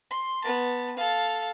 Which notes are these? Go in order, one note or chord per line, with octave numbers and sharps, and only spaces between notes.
C6
B3 A5
A4 F5